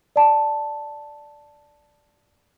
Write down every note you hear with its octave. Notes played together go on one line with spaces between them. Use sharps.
D5 A5